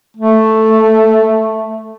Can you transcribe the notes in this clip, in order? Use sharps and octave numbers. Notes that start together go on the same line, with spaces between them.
A3